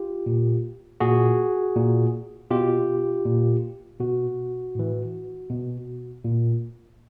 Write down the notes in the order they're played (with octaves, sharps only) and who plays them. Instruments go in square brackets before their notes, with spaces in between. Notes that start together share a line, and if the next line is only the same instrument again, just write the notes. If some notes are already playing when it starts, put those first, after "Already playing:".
Already playing: [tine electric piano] F4 G4
A#2
A#2 F#4 G#4
A#2
B2 F4 G4
A#2
B2 F#4
A2 E3
B2
A#2